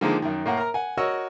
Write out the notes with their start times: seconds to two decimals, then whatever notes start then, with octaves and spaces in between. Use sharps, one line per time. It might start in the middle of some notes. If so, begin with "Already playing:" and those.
0.01 D3 D#3 F3 G#3 A#3 D#4
0.22 F#2 D#3
0.46 A2 A#3 F#5
0.57 A#4 A#5
0.74 F#5 G#5
0.97 F#4 A#4 C#5 D#5 C#6 E6